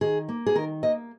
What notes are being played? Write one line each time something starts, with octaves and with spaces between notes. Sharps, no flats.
D#3 G#4
A#3
G#4
D#3 A#4
A#3 D#5